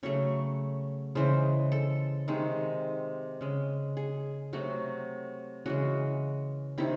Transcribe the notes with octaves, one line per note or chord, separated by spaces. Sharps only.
C#3 F#3 A3 C#5
C#3 E3 G#3 C5
A4
C3 D#3 G#3
C#3 G#3
G#4
C3 F#3 A3 F#4
C#3 E3 G#3 F#4
C3 D#3 E4